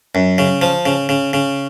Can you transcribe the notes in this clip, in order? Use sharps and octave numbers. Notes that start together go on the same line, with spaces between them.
F#2
C#3
F3
C#3
C#3
C#3